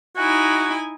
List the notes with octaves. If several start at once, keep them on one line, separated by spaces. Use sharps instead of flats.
D#4 E4 F#4 G#5